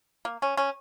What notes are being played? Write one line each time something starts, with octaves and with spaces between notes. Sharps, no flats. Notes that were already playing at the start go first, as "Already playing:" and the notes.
A#3
C#4
C#4